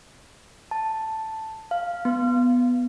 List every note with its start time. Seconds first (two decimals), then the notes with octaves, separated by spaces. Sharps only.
0.71 A5
1.71 F5
2.05 B3